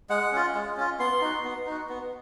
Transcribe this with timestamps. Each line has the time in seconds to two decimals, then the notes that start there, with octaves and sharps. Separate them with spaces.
0.10 G#3 F#5
0.32 C#4 F4
0.55 G#3
0.77 C#4 F4
0.99 B3 C6
1.21 D#4 F#4
1.44 B3
1.66 D#4 F#4
1.89 B3